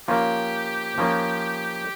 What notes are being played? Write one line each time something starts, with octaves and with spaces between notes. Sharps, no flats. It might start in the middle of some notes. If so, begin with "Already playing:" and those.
F3 A#3 C#4 F4 G4
F3 A#3 C#4 F4